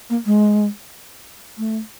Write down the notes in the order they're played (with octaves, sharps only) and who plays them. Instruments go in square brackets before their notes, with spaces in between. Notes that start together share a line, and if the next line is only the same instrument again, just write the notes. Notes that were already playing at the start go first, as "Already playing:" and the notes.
[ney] A#3
G#3
A3